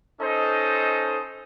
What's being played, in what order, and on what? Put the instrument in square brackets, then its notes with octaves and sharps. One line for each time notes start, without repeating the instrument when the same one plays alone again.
[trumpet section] C#4 D#4 A4 C5 D#5